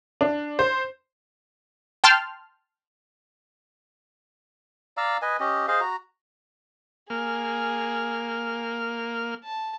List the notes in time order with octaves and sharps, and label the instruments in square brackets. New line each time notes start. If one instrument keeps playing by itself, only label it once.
[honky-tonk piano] D4
C5
[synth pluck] G5 A5 C6 F6
[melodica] D5 F5 A#5 E6
B4 D#5 G#5
C#4 G4 D#5
G#4 C5 D#5 F5
F#4 A#5
[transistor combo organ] A#3 F6 [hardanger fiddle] G#4
[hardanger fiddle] A5